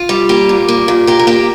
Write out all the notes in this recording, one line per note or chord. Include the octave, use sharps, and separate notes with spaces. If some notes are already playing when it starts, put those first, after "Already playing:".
Already playing: F4
G3
A#3 G4
A#2
A#3
A#2
A#3 G4
A#4
A#3 G4